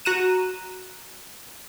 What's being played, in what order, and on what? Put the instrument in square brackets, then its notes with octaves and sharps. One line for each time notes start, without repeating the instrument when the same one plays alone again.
[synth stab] F#4 A#5 F#6 D#7 E7